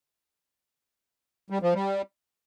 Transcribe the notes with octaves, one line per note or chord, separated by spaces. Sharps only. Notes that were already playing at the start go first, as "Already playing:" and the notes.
G3
F3
G3